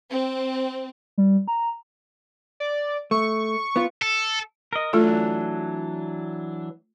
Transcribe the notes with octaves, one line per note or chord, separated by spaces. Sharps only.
C4
G3
A#5
D5
A3 C#6
B3 F4
A4
A#4 D#5
E3 F#3 A3 D4 F4 A4